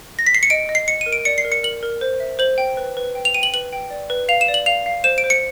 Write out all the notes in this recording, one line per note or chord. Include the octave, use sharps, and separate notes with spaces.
A#6
B6
C7
C#7
D#5 D7
D#5
C7
D#5 C#7
D#7
A#4
D7
D5 C#7
C7
A#4
C#7
A#4 F#7
A#4
C5
E5
C5 F#7
G5
B4
B4
G5
F7
G5 D#7
F#7
B4 F#7
G5
D5
B4
F5 F7
E7
D5
F#7
F5 F7
F5
C5 E7
D7
C5
C#7